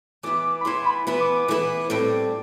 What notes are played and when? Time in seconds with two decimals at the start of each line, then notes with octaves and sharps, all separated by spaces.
0.23 E3 B3 E4 B4 D6
0.61 B5
0.65 E3 B3 E4 B4 C6
0.86 B5
1.07 E3 B3 E4 B4 B5
1.20 D6
1.35 D6
1.48 E3 B3 E4 B4
1.90 A2 G3 C4